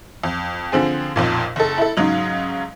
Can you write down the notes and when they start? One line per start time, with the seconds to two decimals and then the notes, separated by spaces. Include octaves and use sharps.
0.23 F2
0.72 D3 F3 C4 G#4
1.16 B1 F2 A#2
1.56 F#1 A4
1.78 E4 A4
1.97 G#2 C#3 F#3 D#4